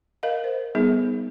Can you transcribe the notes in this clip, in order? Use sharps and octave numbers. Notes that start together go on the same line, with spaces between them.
A#4 D#5 F5
C5
G3 B3 D#4 G#4